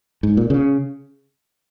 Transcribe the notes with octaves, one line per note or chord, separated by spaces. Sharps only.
G#2
A#2
C#3